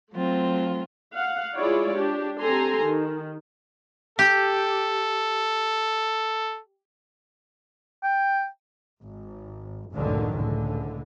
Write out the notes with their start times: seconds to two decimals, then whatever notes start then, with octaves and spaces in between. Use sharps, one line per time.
0.14 F#3 A3 C4 F4
1.13 F5 F#5
1.55 G#3 E4 F4 G#4 C#5 D5
1.94 D4 G4
2.40 C4 G4 A4 G#5 A#5 C6
2.82 D#3
4.19 G4 A4
8.03 G5
9.02 G#1
9.93 F1 C#2 F#2 A2 D3 D#3
10.32 C#2 A2 D3